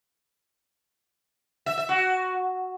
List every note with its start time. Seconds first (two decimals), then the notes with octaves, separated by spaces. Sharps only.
1.66 E5
1.78 E5
1.89 F#4